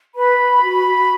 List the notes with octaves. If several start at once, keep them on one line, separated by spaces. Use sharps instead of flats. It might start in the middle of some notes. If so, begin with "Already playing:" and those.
B4 B5
B4
F#4
F#4